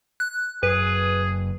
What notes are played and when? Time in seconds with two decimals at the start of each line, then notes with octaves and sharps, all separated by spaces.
0.20 F#6
0.63 F#1 G#4 B4